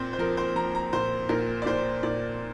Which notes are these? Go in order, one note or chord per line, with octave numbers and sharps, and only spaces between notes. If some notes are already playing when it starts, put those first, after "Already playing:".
Already playing: A#2 C4 C5
C5
F3 A#4
C5
F3 A#5
A#5
A#2 C5
A#2 A#4
D5
A#2 C5
A#2 D5